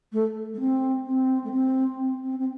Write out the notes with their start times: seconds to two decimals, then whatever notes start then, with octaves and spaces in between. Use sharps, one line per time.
0.12 A3
0.54 A3
0.59 C4
1.06 C4
1.44 A3
1.51 C4
1.97 C4
2.21 C4
2.39 C4